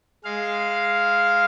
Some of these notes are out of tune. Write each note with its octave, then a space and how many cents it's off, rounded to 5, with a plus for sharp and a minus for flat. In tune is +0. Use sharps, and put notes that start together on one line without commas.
G#3 +0 F5 +0